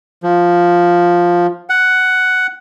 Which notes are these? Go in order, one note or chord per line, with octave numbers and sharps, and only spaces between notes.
F3
F#5